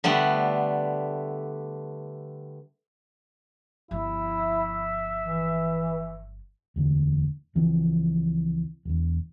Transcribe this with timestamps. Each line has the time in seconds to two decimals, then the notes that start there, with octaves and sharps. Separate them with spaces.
0.04 D3 G3 A3 B3
3.91 G1 F3 E4 E5
5.24 E3
6.76 E1 D2 D3
7.55 C#2 E3 F3 C4
8.85 E1 E2